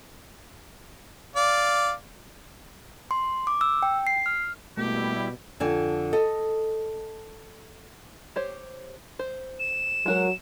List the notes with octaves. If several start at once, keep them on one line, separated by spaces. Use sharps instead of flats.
D5 F5
C6
D6
E6
G5
C7
F6
B2 G3 A3 A#3 E4 G4
F2 D3 G#5
A4 D#5
G4 C5 C#5
C5
E7
F#3 G#3 F#4 A#4